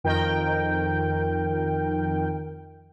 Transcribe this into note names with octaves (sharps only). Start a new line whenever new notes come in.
F2 D#3 A#4 G5